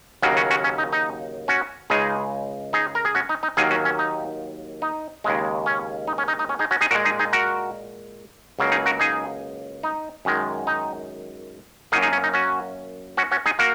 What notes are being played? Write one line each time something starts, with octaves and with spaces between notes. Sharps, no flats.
D#2 C#3 F#3 A#3 C#4 F#4
C#4 F#4
C#4 F#4
C#4
D#4
D#4
C#4 F#4
C#2 C#3 G#3 D#4 G#4
D#4 G#4
A#4
G#4
C#4 F#4
D#4
D#4
D#2 D#3 F#3 A#3 D#4 G#4
C#4 F#4
C#4
D#4
D#4
D#2 C#3 G#3
C#4
D#4
C#4
D#4
D#4
C#4
D#4 G#4
C#4 F#4
D#4 G#4
A#2 G#3 F#4 A#4
D#4 G#4
D#4 G#4
F#4 A#4
C#2 C#3 F#3 A#3
D#4 G#4
F#4 A#4
D#4 G#4
D#4
F#2 D#3 G#3
D#4
F#2 F#3 A#3 D#4 G#4
D#4 G#4
C#4
D#4
C#4 F#4
C#4 F#4
C#4 F#4
D#4 G#4
A#3 F#4 A#4